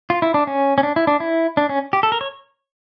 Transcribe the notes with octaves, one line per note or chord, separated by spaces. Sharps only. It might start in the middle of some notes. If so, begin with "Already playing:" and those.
F4
E4
D4
C#4
C#4
D4
E4
D4
E4
D4
C#4
G4
A4
A#4
C#5